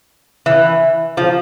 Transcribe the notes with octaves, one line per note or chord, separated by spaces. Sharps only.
E3
F3